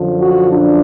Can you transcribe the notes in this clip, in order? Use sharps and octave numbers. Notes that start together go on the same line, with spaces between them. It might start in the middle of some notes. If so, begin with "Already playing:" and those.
Already playing: F#2 D3 F3
F#4
D4